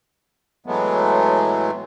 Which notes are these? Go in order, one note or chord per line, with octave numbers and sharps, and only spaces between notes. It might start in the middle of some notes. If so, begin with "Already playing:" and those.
A2 E3 F#3 G#3 A3 B3